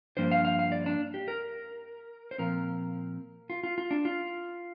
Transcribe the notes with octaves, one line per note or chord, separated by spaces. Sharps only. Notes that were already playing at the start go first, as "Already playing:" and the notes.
G2 F3 A#3 D4 C5
F5
F5
F5
D5
D4
G4
A#4
C5
A#2 F3 C4 A#4
F4
F4
F4
D4
F4